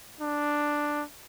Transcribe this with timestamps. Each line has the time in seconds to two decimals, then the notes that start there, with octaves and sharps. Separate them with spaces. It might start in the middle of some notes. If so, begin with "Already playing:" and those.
0.21 D4